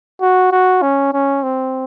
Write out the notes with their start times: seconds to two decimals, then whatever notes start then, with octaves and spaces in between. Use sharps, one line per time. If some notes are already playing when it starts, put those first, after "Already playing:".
0.21 F#4
0.52 F#4
0.82 C#4
1.13 C#4
1.43 C4